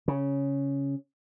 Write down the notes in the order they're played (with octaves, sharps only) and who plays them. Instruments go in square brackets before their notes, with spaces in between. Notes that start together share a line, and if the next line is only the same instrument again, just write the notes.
[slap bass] C#3